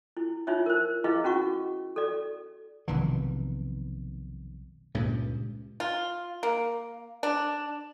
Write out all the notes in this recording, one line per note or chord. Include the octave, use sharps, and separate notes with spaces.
E4
D#4 F4 C#5 E5
A#4 C5
E4 G#4 B4 D#5 F5
C#4 F#4 F#5 C#6
A4 D5
F1 B1 D#3 E3
C#2 G2 A#2
F4
A#3
D4